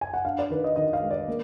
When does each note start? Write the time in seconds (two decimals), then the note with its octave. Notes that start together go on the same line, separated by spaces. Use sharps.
0.01 G#5
0.14 F#5
0.25 D4 F5
0.39 D5
0.50 D#3 B4
0.64 D#5
0.76 D#3 D#5
0.93 F5
1.01 G#3
1.11 D5
1.28 A#3